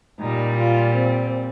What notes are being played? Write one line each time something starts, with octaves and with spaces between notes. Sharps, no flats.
A#2 G3 D#4
F4
C4